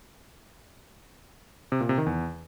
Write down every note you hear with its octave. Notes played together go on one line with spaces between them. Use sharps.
C3
A#2
C3
D#3
E2